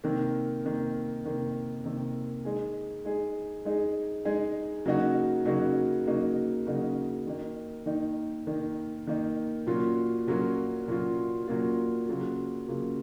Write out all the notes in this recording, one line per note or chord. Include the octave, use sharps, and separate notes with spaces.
C3 D#3 A#3
C3 D#3 A#3
C3 D#3 A#3
C3 D#3 A#3
G#3 D#4 G#4
G#3 D#4 G#4
G#3 D#4 G#4
G#3 D#4 G#4
C#3 F#3 A#3 D#4 F#4
C#3 F#3 A#3 D#4 F#4
C#3 F#3 A#3 D#4 F#4
C#3 F#3 A#3 D#4 F#4
D#3 A#3 D#4
D#3 A#3 D#4
D#3 A#3 D#4
D#3 A#3 D#4
A#2 F#3 A#3 C#4 F4
A#2 F#3 A#3 C#4 F4
A#2 F#3 A#3 C#4 F4
A#2 F#3 A#3 C#4 F4
C#3 F#3 A#3 F4
C#3 F#3 A#3 F4